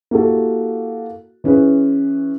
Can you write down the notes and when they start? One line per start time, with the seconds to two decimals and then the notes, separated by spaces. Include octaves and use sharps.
0.11 A#3 E4 F#4 G4 A4
1.44 E3 C#4 G#4 B4